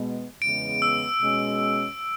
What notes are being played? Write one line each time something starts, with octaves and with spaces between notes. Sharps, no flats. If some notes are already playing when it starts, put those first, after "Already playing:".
Already playing: B2 G#3 B3
E2 C#3 G#3 B3 D7
E6
B2 G#3 C#4